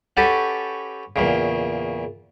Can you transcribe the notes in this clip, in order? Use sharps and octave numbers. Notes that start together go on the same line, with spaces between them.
C#4 F#4 G4 A4 B4 A5
E2 A#2 C#3